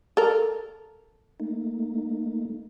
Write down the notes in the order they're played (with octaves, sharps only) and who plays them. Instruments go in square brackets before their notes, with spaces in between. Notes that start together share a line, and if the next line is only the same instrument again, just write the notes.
[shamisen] A4 A#4
[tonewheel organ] A3 A#3 D#4